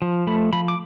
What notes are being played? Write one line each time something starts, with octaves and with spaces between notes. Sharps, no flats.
F3
A3 B5
F3 B5
D6